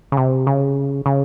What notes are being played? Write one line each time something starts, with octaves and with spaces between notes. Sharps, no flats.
C#3
C3
C#3
C#3